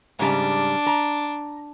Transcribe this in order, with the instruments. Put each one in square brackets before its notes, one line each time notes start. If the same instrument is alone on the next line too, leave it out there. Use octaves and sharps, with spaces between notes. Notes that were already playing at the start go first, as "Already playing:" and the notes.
[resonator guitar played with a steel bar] G#2 C#3 G3 [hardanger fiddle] D4
[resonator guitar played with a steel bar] A#5